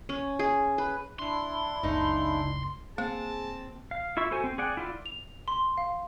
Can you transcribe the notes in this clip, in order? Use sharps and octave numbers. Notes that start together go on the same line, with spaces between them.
C#4
G#4
B4
D4 E4 C6
F#1 C#2 C#3 D#4
A#3 C4 G#4 A5
F5
E4 F4 E5 C#6 E6
F#4 A4 C5 G#5
C4
G#4 D5 F#5 G5
E4 F4 D5
F7
C6
F5